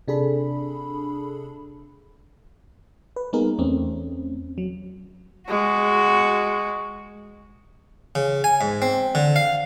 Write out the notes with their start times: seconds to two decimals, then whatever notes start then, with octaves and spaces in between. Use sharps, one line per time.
0.08 C3 D4 G#4 A4 B5
3.16 B4
3.33 G3 A#3 B3 D#4 G#4 A#4
3.58 E2 A3 C4 C#4
4.58 F#3
5.49 G#3 F#4
8.15 C#3
8.44 G#5
8.61 G#2
8.82 C4
9.15 D3
9.36 F5